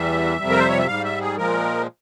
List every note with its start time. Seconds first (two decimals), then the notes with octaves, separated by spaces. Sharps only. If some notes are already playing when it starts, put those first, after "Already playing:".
Already playing: E2 E3 G3 E5
0.38 F2 C3 G3
0.50 A#4
0.59 C5
0.69 C#5
0.78 E5
0.87 G#2 G3 F5
1.04 E5
1.21 G#4
1.37 A#2 F3 G#3 A#4